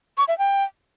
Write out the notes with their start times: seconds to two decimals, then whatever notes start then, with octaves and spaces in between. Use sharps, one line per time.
0.18 C#6
0.28 E5
0.38 G5